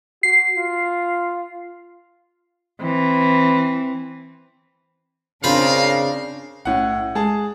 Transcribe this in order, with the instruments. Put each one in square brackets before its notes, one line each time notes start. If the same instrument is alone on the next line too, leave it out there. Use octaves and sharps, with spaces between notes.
[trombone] F#4 [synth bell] C7
[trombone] F4
[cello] E3 C4
[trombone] C#3 [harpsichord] C4 F4 B5 [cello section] D4 A#4 C5 [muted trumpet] F5
[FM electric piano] B1 C#4 [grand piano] A2 F#5
[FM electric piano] G#3 [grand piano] G#4 A5